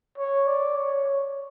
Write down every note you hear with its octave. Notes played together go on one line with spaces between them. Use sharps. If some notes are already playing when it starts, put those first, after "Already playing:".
C#5
D5
C#5